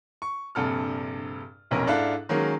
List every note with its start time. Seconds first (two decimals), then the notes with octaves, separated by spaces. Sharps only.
0.22 C#6
0.55 A#1 G2 C3 A4 F6
1.71 F1 B1 F2 C#4 A#4
1.87 G#2 D4 E4 A4 F5 F#6
2.29 D#3 F#3 G#3 A#3 C#4